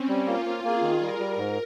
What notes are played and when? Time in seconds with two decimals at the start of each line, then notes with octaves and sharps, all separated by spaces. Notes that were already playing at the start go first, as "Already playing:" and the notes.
Already playing: C4 C#4
0.08 G3
0.27 A#3 F4
0.46 A#3
0.64 A#3 G#4
0.82 D#3
1.01 G3 A#4
1.19 G3
1.38 G#2